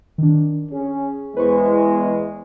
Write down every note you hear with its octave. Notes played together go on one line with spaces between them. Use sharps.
D#3 D4
C#4 G#4
E2 G#3 B4 C5 C#6